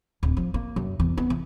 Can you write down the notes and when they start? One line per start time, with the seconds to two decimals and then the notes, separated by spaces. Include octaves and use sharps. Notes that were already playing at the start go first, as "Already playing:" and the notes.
0.23 D1
0.37 F3
0.54 A#3
0.76 F#2
1.00 E2
1.18 B3
1.30 E3